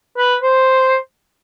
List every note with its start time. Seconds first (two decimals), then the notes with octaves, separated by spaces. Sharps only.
0.17 B4
0.42 C5